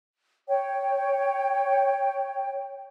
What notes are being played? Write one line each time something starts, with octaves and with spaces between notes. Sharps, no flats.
C#5 G5